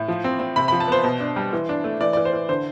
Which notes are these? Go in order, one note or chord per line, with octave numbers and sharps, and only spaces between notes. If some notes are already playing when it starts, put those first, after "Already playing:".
Already playing: A2
F3
C4
C4
C3 B5
B5
F3
A5
B3 C5
B2
D4
G3
E3
D4
A3
E3 D5
D5
E3
C5
E3
D3 C5